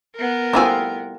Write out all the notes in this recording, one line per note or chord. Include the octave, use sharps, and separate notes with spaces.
B3 A#4
G3 A3 C4 E4 F4 G#4